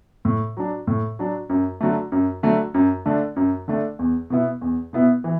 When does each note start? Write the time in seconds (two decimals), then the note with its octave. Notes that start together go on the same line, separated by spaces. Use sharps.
0.25 A2
0.57 F#3 D4
0.87 A2
1.19 F#3 D4
1.49 F#2
1.81 D3 F#3 A3
2.12 F#2
2.43 D3 F#3 A3
2.74 F#2
3.06 D3 A3 D4
3.36 F#2
3.68 D3 A3 D4
3.99 E2
4.30 B2 B3 E4
4.61 E2
4.93 B2 B3 E4
5.24 E3